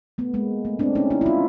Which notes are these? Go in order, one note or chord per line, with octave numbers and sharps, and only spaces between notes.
A3 B3
G#3 A#3
A3
C4 D4
C#4 D#4
D4 E4
E4
D#4 F4